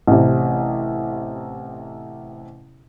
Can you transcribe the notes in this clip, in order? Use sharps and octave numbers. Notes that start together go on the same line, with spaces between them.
A1 C3